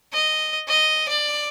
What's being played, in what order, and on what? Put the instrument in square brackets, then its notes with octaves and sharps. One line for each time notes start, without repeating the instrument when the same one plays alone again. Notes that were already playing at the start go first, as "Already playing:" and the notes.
[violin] D#5
D#5
D5